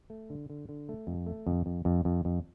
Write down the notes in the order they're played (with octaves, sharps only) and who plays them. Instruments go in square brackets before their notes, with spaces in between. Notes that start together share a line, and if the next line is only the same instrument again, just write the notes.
[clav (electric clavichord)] A3
D3
D3
D3
A3
F2
A3
F2
F2
F2
F2
F2